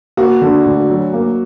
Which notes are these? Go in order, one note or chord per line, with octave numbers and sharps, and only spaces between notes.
A#3 F#4
D3
D2
F#3
A#3